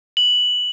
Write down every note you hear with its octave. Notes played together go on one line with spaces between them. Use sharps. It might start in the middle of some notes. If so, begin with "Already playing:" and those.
F#7